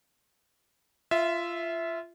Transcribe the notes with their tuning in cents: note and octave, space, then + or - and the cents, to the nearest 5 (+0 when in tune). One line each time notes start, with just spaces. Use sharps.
F4 -20 E5 +0